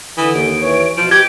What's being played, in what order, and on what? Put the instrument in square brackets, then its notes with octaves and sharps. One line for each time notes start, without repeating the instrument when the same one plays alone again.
[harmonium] D3 [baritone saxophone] E3 [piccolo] D#6
[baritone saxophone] D#2 [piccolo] D7
[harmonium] E3 C#5
[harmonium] B2 [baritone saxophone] F3 [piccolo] D7
[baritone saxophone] G4 [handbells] G#6